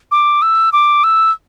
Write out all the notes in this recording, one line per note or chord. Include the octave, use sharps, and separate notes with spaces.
D6
E6
D6
E6